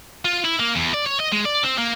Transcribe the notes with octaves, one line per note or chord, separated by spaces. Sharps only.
F4
E4
A#3
E2
D5
C#5
D#5
G#3
D5
C4
A#3